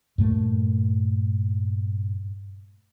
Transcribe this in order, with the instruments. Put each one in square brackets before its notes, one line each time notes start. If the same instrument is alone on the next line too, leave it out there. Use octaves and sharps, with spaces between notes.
[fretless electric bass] G2 A#2 A3 A#3